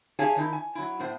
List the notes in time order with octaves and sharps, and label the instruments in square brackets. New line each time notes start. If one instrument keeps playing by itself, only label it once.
[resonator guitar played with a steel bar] G4 G#4 C#5 F5 G#5 A5
D#3 D#4 E4
G#5
F#3 E4
A2 B3 C5